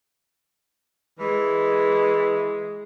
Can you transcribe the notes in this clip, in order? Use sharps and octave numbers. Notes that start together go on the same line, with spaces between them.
E3 G#3